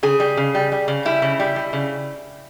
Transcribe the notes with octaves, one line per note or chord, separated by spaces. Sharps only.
C#3 G#4
G3
C#3
G3
G3
C#3
G3 E4
C#3
G3
G3
C#3